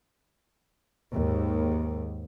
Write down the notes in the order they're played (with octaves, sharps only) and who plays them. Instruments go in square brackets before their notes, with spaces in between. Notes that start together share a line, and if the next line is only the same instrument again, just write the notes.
[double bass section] D#2 G#2